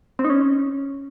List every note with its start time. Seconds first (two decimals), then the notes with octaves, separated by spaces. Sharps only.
0.19 C4
0.24 D#4
0.30 C#4